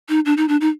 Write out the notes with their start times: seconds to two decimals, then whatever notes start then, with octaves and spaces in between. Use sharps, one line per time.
0.09 D#4
0.26 D4
0.37 D#4
0.48 D4
0.61 D#4